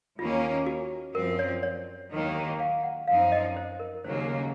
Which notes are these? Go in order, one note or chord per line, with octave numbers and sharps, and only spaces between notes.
D#2 D#3 A#3 C#4 F4
F#4
F#2 F3 C4 A#4
C#5
C#5
D#2 D#3 F#3 A#3 D#4
F5
F#5
F#2 F3 C4 D#4 F5
D#5
C5
A#4
D#2 C#3 F#3 A#3 C5